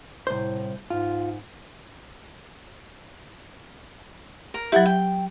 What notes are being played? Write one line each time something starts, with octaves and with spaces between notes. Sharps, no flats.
C2 A2 C5
G#2 F4
A#4
F#3 E4 G4 F#5
G5